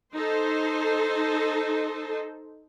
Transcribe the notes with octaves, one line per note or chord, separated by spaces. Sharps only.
D#4 A4 C5